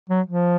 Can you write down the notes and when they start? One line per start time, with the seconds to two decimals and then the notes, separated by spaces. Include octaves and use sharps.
0.09 F#3
0.26 F3